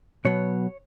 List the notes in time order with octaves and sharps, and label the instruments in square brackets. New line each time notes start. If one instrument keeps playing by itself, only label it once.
[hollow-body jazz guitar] B2 F#3 B3 C#5